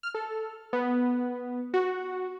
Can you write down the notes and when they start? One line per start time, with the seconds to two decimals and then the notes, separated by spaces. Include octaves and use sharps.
0.03 F6
0.14 A4
0.73 B3
1.74 F#4